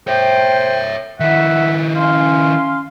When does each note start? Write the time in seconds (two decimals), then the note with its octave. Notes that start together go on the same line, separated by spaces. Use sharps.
0.08 C5 C#5 E5 G5
1.20 D#3 E4 E5 F#5
1.96 C#4 F5 C6